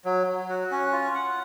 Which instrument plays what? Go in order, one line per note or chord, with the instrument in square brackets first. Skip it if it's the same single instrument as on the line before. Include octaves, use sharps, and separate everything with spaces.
[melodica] F#3
F#3
F#4
C#4
F4
F#5